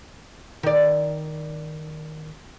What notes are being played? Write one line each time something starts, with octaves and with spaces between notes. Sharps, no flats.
D#3 D5